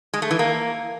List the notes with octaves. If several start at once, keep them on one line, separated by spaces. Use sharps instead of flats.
G#3
A3
E3
A#3